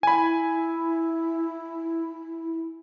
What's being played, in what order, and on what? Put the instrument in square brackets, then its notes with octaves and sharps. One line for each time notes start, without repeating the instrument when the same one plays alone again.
[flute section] E4 [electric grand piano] G#5 B5